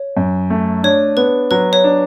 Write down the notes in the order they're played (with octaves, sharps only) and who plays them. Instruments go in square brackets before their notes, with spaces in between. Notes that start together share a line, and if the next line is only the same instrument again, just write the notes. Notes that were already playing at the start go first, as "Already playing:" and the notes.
Already playing: [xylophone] C#5
[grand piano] F#2
A3
[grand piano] D4 [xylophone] C#5
[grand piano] B3 [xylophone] B4
[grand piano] F#3 [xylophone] B4
[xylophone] C#5
[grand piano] D4